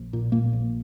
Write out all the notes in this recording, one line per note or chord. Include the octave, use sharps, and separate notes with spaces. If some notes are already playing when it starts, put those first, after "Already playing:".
Already playing: A#1
A#2
A#2 A#3
A#1